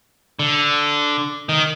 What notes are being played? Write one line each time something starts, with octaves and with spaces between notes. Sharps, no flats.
D3
D#3